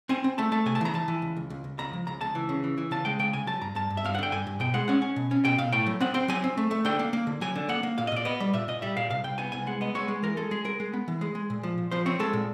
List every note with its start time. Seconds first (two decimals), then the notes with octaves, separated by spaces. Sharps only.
0.09 C4 G#5
0.24 C4
0.38 A3 A5
0.52 A3 A5
0.66 C3 G#5
0.75 A5
0.81 E3
0.85 A#5
0.94 E3 A5
1.08 E3
1.22 C#2
1.37 C#2
1.50 C#2
1.64 C#2
1.79 C#2 A#5
1.93 F3
2.07 C#2 A#5
2.21 C#2 A5
2.35 E3
2.49 C#3
2.64 E3
2.78 E3
2.91 C#3 A5
3.05 G#3 G5
3.19 C#3 G5
3.33 C#3 G#5
3.47 F#3 A5
3.61 G2 A#5
3.75 G2 A5
3.90 G2
3.97 E5
4.04 G2 F5
4.15 F#5
4.19 D3 G5
4.32 G2 G#5
4.47 G2
4.60 B2 G5
4.74 G#3 F#5
4.88 C#4 F#5
5.02 C#4
5.16 B2
5.31 C#4
5.45 B2 G5
5.58 B2 F5
5.72 A2 G5
5.86 F#3
6.00 C4 F#5
6.14 C4 G5
6.28 F#3 G#5
6.44 C4
6.57 A3
6.71 A3
6.85 D3 G5
6.99 A#3
7.13 A#3
7.27 D3
7.41 F#3 G#5
7.56 D3
7.69 A#3 F#5
7.83 A#3
7.98 A#2 F5
8.07 D#5
8.12 A#2 D5
8.25 B3 D#5
8.40 G3
8.53 A#2 E5
8.68 A#2 D#5
8.82 G3 E5
8.97 A#2 F5
9.10 C2 F5
9.24 C2 G5
9.38 B3 G#5
9.52 C2 G#5
9.67 G#3 F#5
9.81 B3 D#5
9.95 G#3 C#5
10.08 G#3
10.23 E3 A#4
10.37 G#3 A4
10.51 G#3 G#4
10.65 G#3 A#4
10.80 G#3
10.94 B3
11.08 E3
11.21 G#3
11.35 G#3
11.50 A#2
11.63 F3
11.78 A#2
11.91 F3 C5
12.06 C4 C#5
12.20 G#3 A4
12.33 A#2